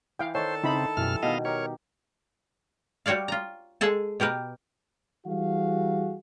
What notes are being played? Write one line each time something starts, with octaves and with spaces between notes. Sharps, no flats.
E3 F5 G5
D#3 D4 A4 C5 C#5 A5
C#3 C4 D#4 E4 B5
F#2 B2 E3 G3 F6
B2 D#3 B3 D#5 F5
D#4 G4 A#4 C#5
G3 F#4 C#5 D5 F5
F4 A#5
G#3 G#4 A4 A5
B2 G4 A#4 B4
E3 G3 F#4 G#4 F5